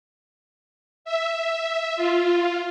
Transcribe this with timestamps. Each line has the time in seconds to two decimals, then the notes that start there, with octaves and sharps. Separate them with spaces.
1.05 E5
1.96 F4